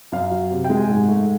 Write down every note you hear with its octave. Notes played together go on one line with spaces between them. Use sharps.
F#2 F5
F#3
C3
G5
G#3
G#5
G#2 G#5
A3